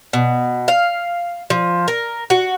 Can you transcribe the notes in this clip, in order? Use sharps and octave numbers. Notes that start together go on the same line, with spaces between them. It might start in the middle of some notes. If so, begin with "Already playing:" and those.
B2
F5
F3
A#4
F#4